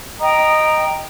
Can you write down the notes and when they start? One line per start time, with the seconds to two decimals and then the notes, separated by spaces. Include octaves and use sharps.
0.20 D#5 G5 A#5 D#6